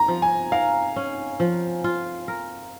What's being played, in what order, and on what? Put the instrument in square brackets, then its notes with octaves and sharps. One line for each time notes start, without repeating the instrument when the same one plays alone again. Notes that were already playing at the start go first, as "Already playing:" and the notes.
Already playing: [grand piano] A#5
[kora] F3
[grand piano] G#5
[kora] A#4 [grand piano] F5
[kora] C#4
F3
F4
A#4